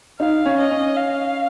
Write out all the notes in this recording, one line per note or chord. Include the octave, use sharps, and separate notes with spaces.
D#4 F5
C#4
D#5
C#4
F5